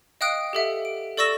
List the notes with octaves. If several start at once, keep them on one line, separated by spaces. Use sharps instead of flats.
D#5 F5 G5 D#6 F#6 D7
G4 A4 E5 F#5
D7
A4 D5 C#6 E6 A#6 E7